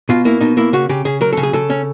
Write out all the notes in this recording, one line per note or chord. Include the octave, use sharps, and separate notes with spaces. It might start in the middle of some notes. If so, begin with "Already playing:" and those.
B2 F4
A#3 E4
B2 D#4
A#3 E4
C#3 F#4
C#3 G4
C#3 G#4
F#3 A#4
C#3 A4
G#4
C#3 A4
C#4